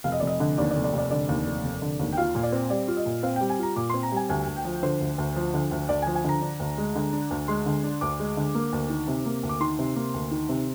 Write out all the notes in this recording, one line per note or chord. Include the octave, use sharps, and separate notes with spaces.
F1 F5
D#5
F1 D5
D#5
D3
D#2 D5
D5
F1
D5
F1
D5
D3 D5
D#2
F1
F1
D3
D#2
G5
F4 F5
A#2
D5
C4
G3 D5
F4
D#5
A#2
C4 F5
G3 G5
G#5
F4 A#5
A#2 D6
C4 C6
A#5
G3 G#5
D2 G#5
D2
G5
F3
D3 C5
D2
D2
F3
D3
D2
D2 D5
G#5
F3
G#5
D3 A#5
D4
D2
G#3
D3
D4
D2
G#3 C6
D3
D4
D2 D6
G#3
D3
A#3
D2
D#3
C3
A#3
D2
D6
D#3 C6
C3
A#3
D2
D#3
C3